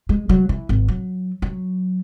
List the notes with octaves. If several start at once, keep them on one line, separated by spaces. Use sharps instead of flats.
G#3
F#3
E3
G#1
F#3
F#3